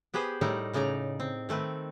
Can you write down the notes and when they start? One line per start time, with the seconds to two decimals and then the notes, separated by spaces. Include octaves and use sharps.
0.14 B3 G4 G#4 B4 C5
0.41 A2 G3 A3 D#4 A#4 F#5
0.73 A2 C#3 D#4 D5 A#5
1.20 C4
1.49 D#3 A3 C4 B4